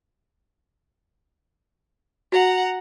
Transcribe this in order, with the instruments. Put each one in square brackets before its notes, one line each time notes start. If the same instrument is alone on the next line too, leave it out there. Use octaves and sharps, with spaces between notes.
[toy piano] F#4 [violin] F#5 A#5